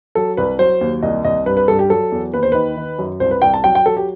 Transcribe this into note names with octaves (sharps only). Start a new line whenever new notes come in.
F#3 A4
C2 B4
F#3 C5
D#2
C2 D#5
C2 D#5
G2 B4
B4
G2 A4
G4
F#3 A4
E2
D#2 B4
C5
D#3 B4
D#3
F#2
C2 C5
B4
C2 G5
A5
F#3 G5
G5
F#3 A4
G4